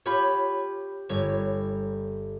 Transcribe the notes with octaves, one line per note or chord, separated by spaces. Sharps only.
F4 G4 C#5 B5
G1 C#5